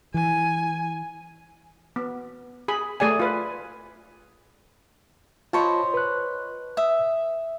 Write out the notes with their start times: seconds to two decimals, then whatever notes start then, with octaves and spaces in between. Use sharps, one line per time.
0.14 E3 G#5
1.96 B3
2.68 G#4 B5
3.00 A3 G#4 D5 G#5
3.20 F4 B4
5.53 F4 C5 C#5 D#5 A5 B5
5.94 B4 F#6
6.77 E5 D#6